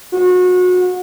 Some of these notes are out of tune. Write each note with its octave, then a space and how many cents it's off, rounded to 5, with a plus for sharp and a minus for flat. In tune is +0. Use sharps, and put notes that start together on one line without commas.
F#4 -30